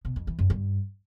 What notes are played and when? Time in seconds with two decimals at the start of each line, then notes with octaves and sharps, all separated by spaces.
0.05 B2
0.16 F2
0.27 E3
0.39 F#2
0.50 G2